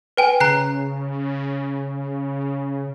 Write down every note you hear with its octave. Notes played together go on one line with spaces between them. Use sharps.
B4 G5 G#5
C#3 A#5 F#6 C7